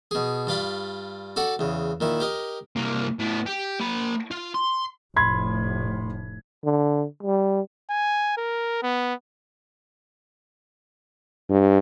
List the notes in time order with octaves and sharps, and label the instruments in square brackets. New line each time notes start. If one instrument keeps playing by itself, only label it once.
[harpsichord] B2 G#4
G2 F4 D5 B5
F#4 A4 D5 F#5
E2 C#3
A#2 D#3 E4
G4 A#4 D#5
[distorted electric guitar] C2 A#3
A2 B3
G4
A#3 B5
F4
C6
[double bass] F1 A2 [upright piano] B5 C6 G#6
[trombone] D3
G3
[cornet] G#5
A#4
B3
[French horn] G2